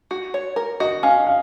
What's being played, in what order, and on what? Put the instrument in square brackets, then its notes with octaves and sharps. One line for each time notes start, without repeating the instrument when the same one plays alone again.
[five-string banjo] F#4
C#5
A#4
[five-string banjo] F#4 [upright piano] D#5
[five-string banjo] C#4 [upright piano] F5
[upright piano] F5